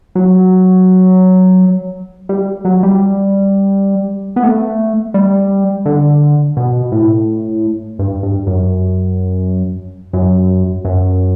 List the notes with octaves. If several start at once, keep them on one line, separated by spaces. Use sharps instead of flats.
F#3
G3
F#3
G3
B3
A3
G3
D3
B2
A2
G2
G2
F#2
F#2
F#2